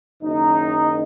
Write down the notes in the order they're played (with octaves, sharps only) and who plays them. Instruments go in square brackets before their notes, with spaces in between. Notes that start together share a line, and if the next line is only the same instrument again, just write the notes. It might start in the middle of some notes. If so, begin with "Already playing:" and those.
[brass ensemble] F#1 F#2 D#3 D#4